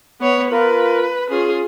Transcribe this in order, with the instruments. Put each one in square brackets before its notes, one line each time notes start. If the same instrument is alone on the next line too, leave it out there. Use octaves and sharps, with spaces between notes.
[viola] B3 C#5
[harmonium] F4 A#4 [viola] B4
[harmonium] C#4 [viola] F4 G#4